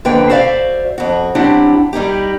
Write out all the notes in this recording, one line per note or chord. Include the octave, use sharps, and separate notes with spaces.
F2 D3 A#3 B4 G5
F#4 C5 D5 E5 F5
F2 F#4
F#3 C4 D4 E4 G4 F#5
G3 D#4 E4 G4